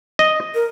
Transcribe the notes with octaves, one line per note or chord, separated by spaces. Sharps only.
D#5
A#4